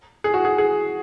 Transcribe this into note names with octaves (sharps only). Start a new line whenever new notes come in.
G#4
F#4
G#4
G#4